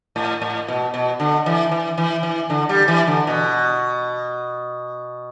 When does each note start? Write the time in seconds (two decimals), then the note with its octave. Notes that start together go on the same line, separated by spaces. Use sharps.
0.16 A2
0.42 A2
0.68 B2
0.94 B2
1.20 D3
1.46 E3
1.71 E3
1.98 E3
2.23 E3
2.50 D3
2.69 G3
2.88 E3
3.07 D3
3.27 B2